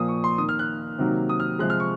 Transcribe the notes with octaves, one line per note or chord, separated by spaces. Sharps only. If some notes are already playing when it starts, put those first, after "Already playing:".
Already playing: A#2 F3 A#3 D#6
C#6
C6
D#3 A#3 D#6
F6
F#6
C3 D#3 F#3 A#3
D#6
F6
C3 F3 G#3 F#6
F6
C#6